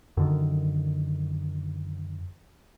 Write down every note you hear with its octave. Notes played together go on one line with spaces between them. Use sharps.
F#2 D3 D#3